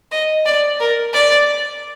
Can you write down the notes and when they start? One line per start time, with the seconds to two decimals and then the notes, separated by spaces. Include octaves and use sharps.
0.11 D#5
0.45 D5
0.80 A#4
1.13 D5